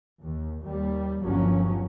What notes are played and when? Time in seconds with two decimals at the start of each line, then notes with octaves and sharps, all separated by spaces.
0.21 D#2
0.62 D#2 G3
1.22 G1 D#2 F3 F#3 C#4